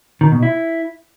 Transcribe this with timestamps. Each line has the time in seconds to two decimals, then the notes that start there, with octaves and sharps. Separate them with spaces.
0.21 D#3
0.32 B2
0.43 E4